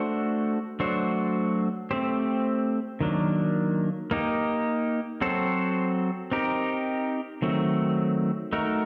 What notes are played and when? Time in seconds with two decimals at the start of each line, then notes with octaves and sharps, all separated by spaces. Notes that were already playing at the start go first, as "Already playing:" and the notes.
Already playing: A3 D4 F#4 C5
0.80 F#3 A3 D4 F#4 C5
1.91 A3 C4 G4 C5
3.01 D#3 F#3 A#3 D4
4.11 A#3 D#4 G4
5.21 F#3 C4 F#4 A4 C5
6.32 C4 D#4 G4 A#4
7.42 D#3 F#3 A3 C4 F#4
8.53 A3 D#4 F#4 A#4